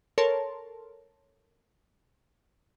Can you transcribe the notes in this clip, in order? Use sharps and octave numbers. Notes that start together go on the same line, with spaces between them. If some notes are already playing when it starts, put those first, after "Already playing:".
A4 A#4 C#5 A5 C6